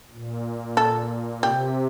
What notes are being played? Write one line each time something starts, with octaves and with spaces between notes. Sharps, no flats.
A#2
A4
C3 G4